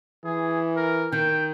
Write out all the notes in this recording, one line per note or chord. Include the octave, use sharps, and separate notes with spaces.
E3 G#4
A#4
D#3 G5